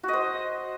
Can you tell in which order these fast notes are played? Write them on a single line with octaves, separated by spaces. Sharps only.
F#4 D#5 C5